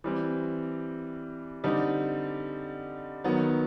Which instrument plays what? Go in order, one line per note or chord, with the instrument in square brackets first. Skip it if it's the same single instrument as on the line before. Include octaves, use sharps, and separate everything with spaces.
[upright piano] E3 G3 C4
D3 G3 C4 D#4
D#3 F#3 B3